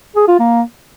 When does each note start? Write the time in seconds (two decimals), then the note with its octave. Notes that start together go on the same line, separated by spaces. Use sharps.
0.16 G#4
0.27 F4
0.39 A#3